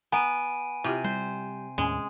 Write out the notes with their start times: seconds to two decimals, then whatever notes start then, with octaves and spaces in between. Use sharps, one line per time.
0.12 B3 G#5 A#5 D7 D#7
0.84 C3 E4 F4 G4
1.04 G3 C5
1.78 D#2 A2 G#3 C#4 G#5